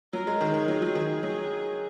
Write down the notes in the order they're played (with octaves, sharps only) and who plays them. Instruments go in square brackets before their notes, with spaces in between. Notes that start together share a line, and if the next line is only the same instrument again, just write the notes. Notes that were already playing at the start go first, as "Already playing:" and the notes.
[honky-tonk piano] F#3 [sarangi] A#4
[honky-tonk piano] G#3
D#3
[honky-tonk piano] D#3 [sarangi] G#4
[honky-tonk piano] F#3
F#3
D#3
F#3